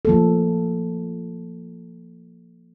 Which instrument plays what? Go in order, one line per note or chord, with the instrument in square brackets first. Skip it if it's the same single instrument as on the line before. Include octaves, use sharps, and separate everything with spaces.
[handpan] F3 A#3 A4